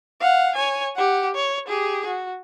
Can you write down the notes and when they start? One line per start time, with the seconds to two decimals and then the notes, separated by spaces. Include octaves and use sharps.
0.21 F5 F#5
0.56 C#5 G#5
0.96 G4 F#5
1.35 C#5
1.68 G4 G#4
2.07 F#4